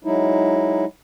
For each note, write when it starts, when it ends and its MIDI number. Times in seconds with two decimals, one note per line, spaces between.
0.04 0.85 54
0.04 0.85 56
0.04 0.85 63
0.04 0.85 64